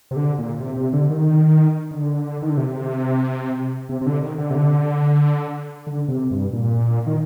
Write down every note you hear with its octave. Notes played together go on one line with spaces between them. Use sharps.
C3
D3
A#2
C3
C3
D3
D#3
D3
D#3
D3
C3
C3
C3
D3
D#3
D3
C3
D3
D3
C3
G2
A#2
D#3